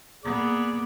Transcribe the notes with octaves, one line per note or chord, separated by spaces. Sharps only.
A#3 B3 G#4 D5